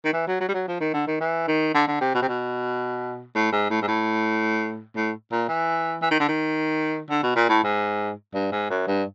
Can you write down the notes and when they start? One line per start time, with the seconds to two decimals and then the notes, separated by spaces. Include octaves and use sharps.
0.05 D#3
0.13 E3
0.27 F#3
0.40 F#3
0.48 G3
0.54 F#3
0.68 F3
0.80 D#3
0.93 D3
1.07 D#3
1.20 E3
1.47 D#3
1.74 D3
1.88 D3
2.01 C3
2.15 B2
2.22 C3
2.28 B2
3.35 A2
3.52 G#2
3.70 A2
3.81 G#2
3.88 A2
4.96 A2
5.31 A#2
5.48 E3
6.02 E3
6.11 D#3
6.20 D3
6.28 D#3
7.10 D3
7.23 B2
7.36 A#2
7.49 A2
7.63 G#2
8.34 G2
8.52 G#2
8.70 F#2
8.87 G2